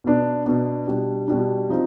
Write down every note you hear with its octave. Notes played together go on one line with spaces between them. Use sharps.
B2 B3 D4
B2 B3 D4
B2 G3 D4
B2 G3 D4
F3 C4 D#4